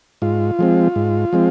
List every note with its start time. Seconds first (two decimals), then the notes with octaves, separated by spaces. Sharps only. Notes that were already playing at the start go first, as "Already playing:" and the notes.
0.22 G#2 F4
0.59 F3 G#3 C4
0.96 G#2
1.33 F3 G#3 C4